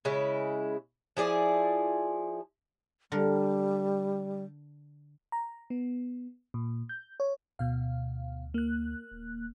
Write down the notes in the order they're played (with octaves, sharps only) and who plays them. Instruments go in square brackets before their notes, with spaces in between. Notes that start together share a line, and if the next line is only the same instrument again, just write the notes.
[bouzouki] C#3 G#3 E4
F3 E4 G#4 D5
[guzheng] D3 A#4 [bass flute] G3
[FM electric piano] A#5
B3
A#2
G6
C#5
[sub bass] D2 [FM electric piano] B2 F5
[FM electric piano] A#3 F#6
[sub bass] D#1